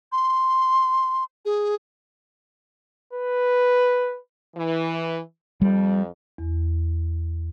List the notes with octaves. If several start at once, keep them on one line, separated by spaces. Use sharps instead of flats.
C6
G#4
B4
E3
F2 G3
E2